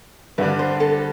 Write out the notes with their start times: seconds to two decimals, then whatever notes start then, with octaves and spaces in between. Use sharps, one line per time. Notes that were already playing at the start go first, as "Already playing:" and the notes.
0.38 G2 D3 G3 D4 B4
0.59 C5
0.80 A4